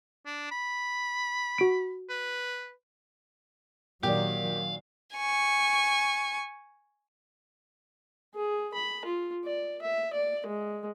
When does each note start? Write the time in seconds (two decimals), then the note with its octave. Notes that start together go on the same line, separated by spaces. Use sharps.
0.26 D4
0.51 B5
1.58 F#4 D7
2.10 B4
4.03 A#2 D#3 F#3 G4 D5 F5
5.16 G#5 C#6
8.35 G#4
8.74 B5
9.05 F4
9.45 D5
9.82 E5
10.13 D5
10.47 G#3